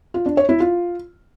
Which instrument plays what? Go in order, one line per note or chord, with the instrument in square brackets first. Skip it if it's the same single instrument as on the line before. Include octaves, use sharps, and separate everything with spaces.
[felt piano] F4
D4
C#5
E4
F4